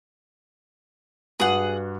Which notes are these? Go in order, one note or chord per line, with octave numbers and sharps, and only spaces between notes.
G2 F#4 G#4 F#5